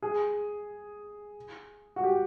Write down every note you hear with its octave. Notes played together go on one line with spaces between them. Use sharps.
G#4
F#4
G4